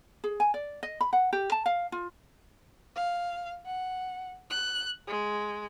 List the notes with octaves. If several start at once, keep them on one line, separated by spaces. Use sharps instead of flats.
G#4
G#5
D5
D#5
B5
F#5
G4
A5
F5
F4
F5
F#5
F#6
G#3